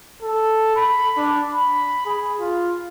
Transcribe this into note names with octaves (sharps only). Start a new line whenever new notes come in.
A4
B5
D4
B5
G#4
F4